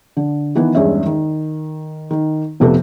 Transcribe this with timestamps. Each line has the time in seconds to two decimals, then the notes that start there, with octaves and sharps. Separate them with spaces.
0.17 D3
0.55 D#3 E3 B3
0.75 E2 G2 G#3 C#4 D#5 E5
1.06 D#3
2.11 D#3
2.60 F1 F2 C3 B3 A4